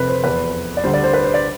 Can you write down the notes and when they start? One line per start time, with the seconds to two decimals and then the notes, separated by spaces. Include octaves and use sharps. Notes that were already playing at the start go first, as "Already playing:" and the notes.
Already playing: F1 C3 B4
0.08 C5
0.23 F1 E2 C3 B4
0.77 D5
0.84 D2 D3 G3 C5
0.93 D5
1.04 C5
1.13 B4
1.24 C5
1.34 D5